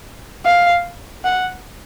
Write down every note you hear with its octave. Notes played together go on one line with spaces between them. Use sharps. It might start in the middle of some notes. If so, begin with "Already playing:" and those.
F5
F#5